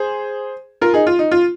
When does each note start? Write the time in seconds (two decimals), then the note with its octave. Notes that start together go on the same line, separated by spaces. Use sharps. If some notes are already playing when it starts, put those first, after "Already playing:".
Already playing: G#4 C5
0.82 F4 A#4
0.94 D#4 G#4
1.07 F4
1.19 D#4
1.31 F4